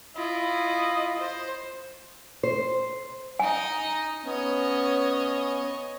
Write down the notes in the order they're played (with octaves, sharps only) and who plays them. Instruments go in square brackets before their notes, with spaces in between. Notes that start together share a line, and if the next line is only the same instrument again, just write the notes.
[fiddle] E4 F4 [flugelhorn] D#5
[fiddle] C5
[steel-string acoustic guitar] C5
[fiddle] D#4 D#5 [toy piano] G#5
[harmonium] B3 C#4 [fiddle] C#5 D#5